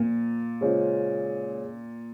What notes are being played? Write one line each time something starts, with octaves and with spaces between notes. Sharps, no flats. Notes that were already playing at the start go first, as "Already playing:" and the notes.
Already playing: A#2 F3 A#3 F4
C#3 G#3 C#4 F4 C5